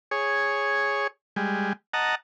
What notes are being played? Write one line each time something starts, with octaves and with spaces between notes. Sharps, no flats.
G#4 C#5
G3 G#3
D#5 F#5 A5 A#5